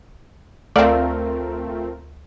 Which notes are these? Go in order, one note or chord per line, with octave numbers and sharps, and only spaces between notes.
D2 A3 C4 F4 A#4 D5 F5